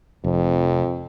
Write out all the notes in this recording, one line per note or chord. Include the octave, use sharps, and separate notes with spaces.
F1 F2